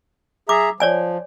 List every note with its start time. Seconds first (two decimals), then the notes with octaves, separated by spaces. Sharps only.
0.49 G#4 E5 A#5 D6
0.80 F3 C#5 D5 G#5